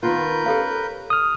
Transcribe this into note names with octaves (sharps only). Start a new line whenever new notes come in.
D#3 B3 F4 A#4 B4 G6
C#4 G4 A4 F5
D#6 F6